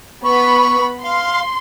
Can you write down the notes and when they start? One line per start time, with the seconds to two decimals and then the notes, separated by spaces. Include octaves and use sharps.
0.23 B3 B5 C#6
1.03 F5 C6